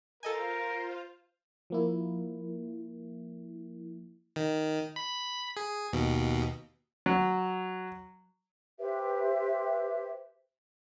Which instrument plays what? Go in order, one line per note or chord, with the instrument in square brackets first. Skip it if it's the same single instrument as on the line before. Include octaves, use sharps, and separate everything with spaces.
[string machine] F4 C5 F5 [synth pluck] A4 D#5 G#5 [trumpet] A#4
[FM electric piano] F3 A#3 E4
[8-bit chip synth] D#3
B5
G#4
D#2 B2
[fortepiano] F#3
[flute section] G4 B4 C5 E5